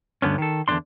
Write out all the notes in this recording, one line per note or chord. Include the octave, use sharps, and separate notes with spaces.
D2 G2 D3 B3 C#4
D#3 A4
E2 B2 D3 D4 C6